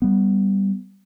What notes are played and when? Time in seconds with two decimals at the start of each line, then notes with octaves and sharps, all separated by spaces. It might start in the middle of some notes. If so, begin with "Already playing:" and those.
0.02 G3 B3